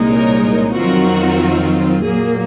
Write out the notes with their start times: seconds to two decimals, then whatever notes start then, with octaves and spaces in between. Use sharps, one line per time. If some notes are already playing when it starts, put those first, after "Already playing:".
Already playing: C2 A#2 G#3 D#4
0.13 A#4 C#5
0.75 F2 D#3 F#3 C4 F4 F#4 A#4
2.01 A#2 F#3 A#3 G#4